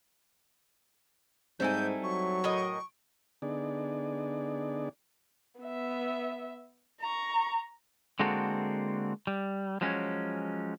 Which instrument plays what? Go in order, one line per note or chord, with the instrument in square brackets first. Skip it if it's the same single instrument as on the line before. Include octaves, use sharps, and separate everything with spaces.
[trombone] G#2 [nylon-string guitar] G3 C4 D#4 [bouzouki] A3 E4 G#5 [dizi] G6
[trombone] F#3 [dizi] C#6
[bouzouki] A2 A#4 D#5
[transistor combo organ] D3 B3 D4 D#4 G#4 D5
[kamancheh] B3 E5
A#5 C#6
[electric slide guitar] D3 G#3 A#3 C4 F#4 A4
G3
F3 F#3 G#3 C#4